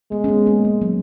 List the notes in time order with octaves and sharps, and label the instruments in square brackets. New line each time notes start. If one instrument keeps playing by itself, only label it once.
[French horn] G#3 [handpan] B3
[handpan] C#4
B3
A#3
G#3
F#3